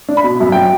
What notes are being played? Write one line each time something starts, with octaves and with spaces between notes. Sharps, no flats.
D4
B5
B2
F#2
F#3 G5